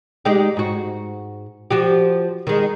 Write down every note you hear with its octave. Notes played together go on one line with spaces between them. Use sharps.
G#3 D#4 G4
G#2 F#4
F3 F#4 G4
D#3 G#3